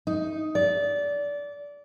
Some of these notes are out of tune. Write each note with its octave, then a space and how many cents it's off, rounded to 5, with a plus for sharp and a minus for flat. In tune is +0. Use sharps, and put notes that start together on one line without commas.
D#4 +5
D5 -20